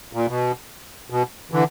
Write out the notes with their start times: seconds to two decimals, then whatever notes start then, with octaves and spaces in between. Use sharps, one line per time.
0.13 A#2
0.27 B2
1.10 B2
1.51 D3 E3